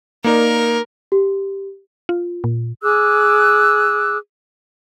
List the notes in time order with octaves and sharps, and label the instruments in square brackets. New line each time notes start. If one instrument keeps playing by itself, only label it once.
[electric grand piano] A#3 D#4 D5 [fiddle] A#4
[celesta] G4
[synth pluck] F4
A#2
[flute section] G#4 D6 E6 F#6